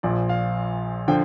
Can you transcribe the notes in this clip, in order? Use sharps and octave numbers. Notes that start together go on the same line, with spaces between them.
A#1 A#2 F3 D5
F5
D3 F3 G5